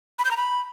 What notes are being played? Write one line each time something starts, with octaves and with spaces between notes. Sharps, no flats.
B5
G6
A#5
B5